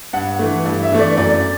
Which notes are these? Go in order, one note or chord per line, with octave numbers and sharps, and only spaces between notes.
G2 F#5
E3 A3
G2
E5
E3 A3
D5
F#2 D5